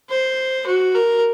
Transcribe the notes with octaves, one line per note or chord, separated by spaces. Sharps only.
C5
F#4
A#4